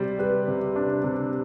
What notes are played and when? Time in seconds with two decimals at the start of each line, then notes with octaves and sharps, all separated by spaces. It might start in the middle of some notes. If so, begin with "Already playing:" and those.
Already playing: C3 G3 C5
0.19 G3 B4
0.48 C3
0.76 D4
1.04 C3